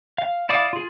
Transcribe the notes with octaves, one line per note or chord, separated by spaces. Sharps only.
F5
E4 D5 F5 D6 D#6
F4 G#4